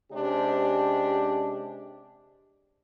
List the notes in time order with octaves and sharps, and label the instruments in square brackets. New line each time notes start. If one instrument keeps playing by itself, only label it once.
[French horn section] C3 G#3 C#4 D4 G4